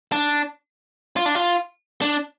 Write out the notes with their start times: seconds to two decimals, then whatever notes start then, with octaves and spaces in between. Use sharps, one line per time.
0.12 D4
1.16 F4
1.26 D4
1.35 F4
2.02 D4